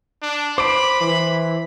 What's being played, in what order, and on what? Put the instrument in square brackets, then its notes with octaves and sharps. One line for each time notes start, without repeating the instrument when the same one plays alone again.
[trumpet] D4
[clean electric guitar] C5 [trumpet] B5 [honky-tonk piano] D6 D7
[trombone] E3